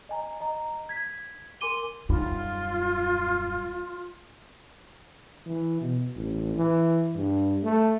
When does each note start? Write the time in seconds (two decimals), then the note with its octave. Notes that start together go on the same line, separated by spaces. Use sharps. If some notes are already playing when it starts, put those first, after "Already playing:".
0.09 D#5 G#5 A#5
0.40 D#5 A#5
0.89 G#6 B6
1.61 A#4 G#5 C6 D6 D#7 G7
2.09 D#1 F#2 G3 D#4 F4
5.46 E3
5.81 B2
6.16 A1
6.55 E3
7.15 G2
7.64 A3